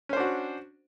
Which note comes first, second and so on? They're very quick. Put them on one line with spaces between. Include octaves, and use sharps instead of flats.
C#4 C5 D4 F#4